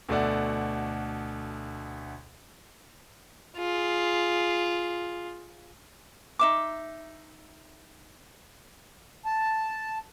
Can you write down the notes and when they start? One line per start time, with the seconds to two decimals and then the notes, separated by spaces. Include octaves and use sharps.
0.09 D2 B2 A3 D5 F#5
3.57 F4 G#4
6.39 D#4 E5 D6
9.26 A5